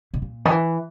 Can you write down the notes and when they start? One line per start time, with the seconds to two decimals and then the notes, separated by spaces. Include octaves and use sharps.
0.14 B2
0.22 A#2
0.45 D#3
0.50 E3